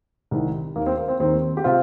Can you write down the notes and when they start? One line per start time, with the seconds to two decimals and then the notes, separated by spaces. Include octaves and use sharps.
0.31 C2 C3 D#3
0.76 D#2 D#3 A#3
0.86 C4
0.97 A#3
1.08 C4
1.19 D#2 D#3 C4
1.57 G4
1.64 C3 C4 F4